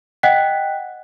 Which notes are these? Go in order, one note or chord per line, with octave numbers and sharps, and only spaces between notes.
D#5 F#5 G5 F#6 B6